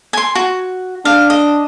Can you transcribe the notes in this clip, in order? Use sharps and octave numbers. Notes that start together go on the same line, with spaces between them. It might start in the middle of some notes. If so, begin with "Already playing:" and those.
G#5 C6
F#4
D4 F5
D#5